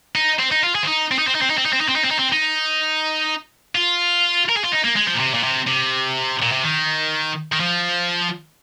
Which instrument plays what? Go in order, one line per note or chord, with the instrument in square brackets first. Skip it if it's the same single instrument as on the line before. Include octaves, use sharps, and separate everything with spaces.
[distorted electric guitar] D#4
C4
D#4
F4
G#4
C4
D#4
C4
D#4
C4
D#4
C4
D#4
C4
D#4
C4
D#4
C4
D#4
C4
D#4
C4
D#4
F4
A#4
G#4
F4
D#4
A#3
G#3
F3
A#2
C3
A#2
C3
C3
A#2
C3
D#3
D#3
F3